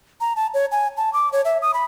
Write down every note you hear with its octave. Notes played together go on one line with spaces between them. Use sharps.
A#5
A5
C#5
G#5
A5
D6
C#5
E5
D#6
B5